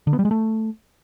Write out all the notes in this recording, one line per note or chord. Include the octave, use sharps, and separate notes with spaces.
D3
B3
G3
G#3
A3